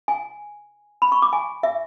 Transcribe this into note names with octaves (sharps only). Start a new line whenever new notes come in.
G#5
B5
C#6
D6
G#5
E5